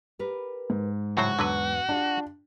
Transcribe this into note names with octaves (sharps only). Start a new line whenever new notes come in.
G4 A#4 B4
G#2
A2 C#3 F#3 F#4 C5
E2 D3 F#3 B4
D4 F4 G4